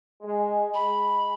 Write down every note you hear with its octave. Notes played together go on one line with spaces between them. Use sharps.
G#3
G#3 B5